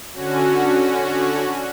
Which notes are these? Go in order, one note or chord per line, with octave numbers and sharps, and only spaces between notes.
D3 C#4 F#4